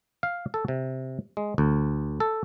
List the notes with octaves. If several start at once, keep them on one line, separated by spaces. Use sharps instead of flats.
F5
A4
C3
G#3
D2
A4